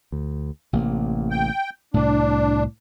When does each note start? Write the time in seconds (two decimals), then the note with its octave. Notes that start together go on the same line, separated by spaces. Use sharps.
0.12 D2
0.73 A1 C3 A#3
1.31 G5
1.94 C2 A2 D4